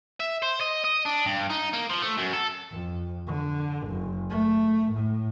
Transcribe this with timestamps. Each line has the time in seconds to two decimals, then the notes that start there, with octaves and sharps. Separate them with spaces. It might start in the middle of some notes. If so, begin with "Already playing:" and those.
0.20 E5
0.42 C5
0.60 D#5
0.84 D#5
1.05 D4
1.26 G2
1.50 D#4
1.73 A#3
1.90 F3
2.02 A3
2.18 F#2
2.33 A4
2.71 F2
3.27 D3
3.88 F#1
4.30 A3
4.92 A2